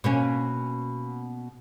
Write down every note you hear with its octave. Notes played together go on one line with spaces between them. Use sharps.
B2 A#3 C#4